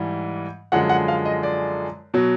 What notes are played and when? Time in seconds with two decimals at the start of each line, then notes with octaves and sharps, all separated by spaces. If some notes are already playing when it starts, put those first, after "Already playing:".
Already playing: G#2 E3 G3
0.72 F#2 D3 F3 G#3 F#5
0.89 F#5
1.08 F5
1.25 D#5
1.43 D5
2.14 B2 F#3